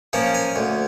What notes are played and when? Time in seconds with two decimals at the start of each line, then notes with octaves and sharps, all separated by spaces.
0.13 F3 A#3 C#4
0.34 G#5
0.56 D2